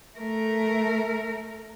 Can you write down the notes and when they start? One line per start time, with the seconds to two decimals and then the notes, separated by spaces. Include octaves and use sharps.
0.18 A3 A#4